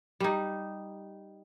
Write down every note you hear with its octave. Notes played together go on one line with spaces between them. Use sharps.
G3 D#4